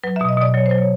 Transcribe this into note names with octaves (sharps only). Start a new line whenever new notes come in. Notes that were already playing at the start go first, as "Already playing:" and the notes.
F#3 B4
B2 E5
D#5
B2 D5
F#3 C#5
C5
F#3
C#5